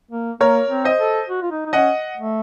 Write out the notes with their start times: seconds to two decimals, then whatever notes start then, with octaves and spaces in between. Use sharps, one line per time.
0.11 A#3
0.41 A#3 A#4 C#5
0.69 C4
0.84 C5 D#5
1.00 A4
1.29 F#4
1.42 F4
1.51 D#4
1.66 D#4
1.73 C#4 D#5 F#5
2.17 A3